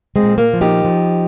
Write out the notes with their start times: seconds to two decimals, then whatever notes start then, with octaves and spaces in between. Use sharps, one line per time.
0.16 G#3 C4
0.23 A#2
0.38 A#3
0.54 F3
0.61 D#4 G4
0.85 F3